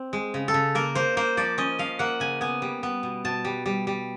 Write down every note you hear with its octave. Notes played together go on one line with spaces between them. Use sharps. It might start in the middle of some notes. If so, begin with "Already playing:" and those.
Already playing: C4
G#3
C#3
A4
C#3
A#3 A#4
A#3 C5
A#3 C5
F3 D5
C#4 D#5
F3 F5
A#3 F#5
C#3 G#5
B3 G#5
G3
B3
B2
B2 A5
G3
G3
G3